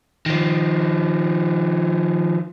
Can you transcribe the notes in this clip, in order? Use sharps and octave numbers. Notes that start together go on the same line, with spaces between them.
D#3 F3